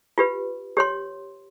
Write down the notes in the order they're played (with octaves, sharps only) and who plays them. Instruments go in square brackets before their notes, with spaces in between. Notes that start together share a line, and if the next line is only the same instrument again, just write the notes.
[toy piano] F4 G4 B4
G4 C#5 C6